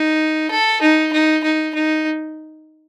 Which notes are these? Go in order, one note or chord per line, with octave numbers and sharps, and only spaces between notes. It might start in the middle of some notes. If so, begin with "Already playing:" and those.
Already playing: D#4
A4
D#4
D#4
D#4
D#4